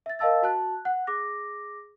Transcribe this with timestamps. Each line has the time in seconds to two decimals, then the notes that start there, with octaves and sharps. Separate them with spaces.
0.06 E5 A6
0.19 A#4 D#5 F5 A5 E6 A6
0.43 F#4 A5 F#6
0.85 F#5 F#6
1.07 G#4 D6 A#6